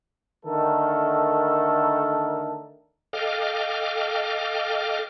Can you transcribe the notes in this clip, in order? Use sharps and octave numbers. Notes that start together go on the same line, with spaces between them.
D3 D#3 A3 A4 A#4
A4 D#5 F5 G5 D6 F6